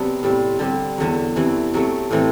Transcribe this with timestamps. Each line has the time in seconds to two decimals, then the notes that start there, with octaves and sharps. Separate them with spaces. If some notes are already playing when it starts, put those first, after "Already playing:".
Already playing: C3 F#3 B3 D4
0.23 A2 G3 C4
0.59 D3 G3 C4 G4
0.98 E2 D3 F#3
1.36 C3 E3 A3 E4
1.74 C3 F#3 A3
2.11 A2 E3 A3 C4